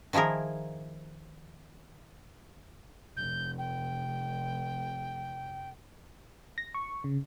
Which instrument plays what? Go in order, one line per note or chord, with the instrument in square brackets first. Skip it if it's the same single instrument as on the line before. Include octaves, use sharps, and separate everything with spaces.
[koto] D#3 F3 E4 G#4 A#4
[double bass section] F1 [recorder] G6
[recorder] G5
[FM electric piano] A#6
C#6
C#3